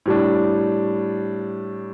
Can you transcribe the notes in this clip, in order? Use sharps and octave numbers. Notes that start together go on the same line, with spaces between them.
A2 G3 D4